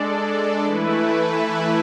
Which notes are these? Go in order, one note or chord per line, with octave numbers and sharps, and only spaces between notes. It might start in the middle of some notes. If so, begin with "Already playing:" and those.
Already playing: G#3 D4 A4 D5
E3 A3 E4 B4